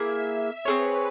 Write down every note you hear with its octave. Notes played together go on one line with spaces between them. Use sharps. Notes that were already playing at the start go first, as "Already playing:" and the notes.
Already playing: A#3 E4 G#4 E5
C4 F4 G#4 B4 C#5